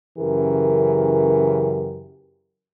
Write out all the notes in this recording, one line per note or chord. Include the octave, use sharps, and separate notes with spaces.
F#2 C#3 E3 G4 A#4